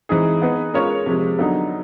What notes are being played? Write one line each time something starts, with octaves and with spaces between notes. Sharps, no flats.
E3 G#3 C4 D#4 G#4
B3 D#4 G#4 B4
G#3 C#4 F4 A#4 C#5
C3 F3 G#3
D3 F#3 B3 D#4